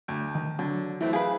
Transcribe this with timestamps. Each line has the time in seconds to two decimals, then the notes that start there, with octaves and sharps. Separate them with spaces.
0.08 D2
0.35 D#3
0.59 D3 F#3
1.01 E3 A3 C4
1.13 G#4 B4 F5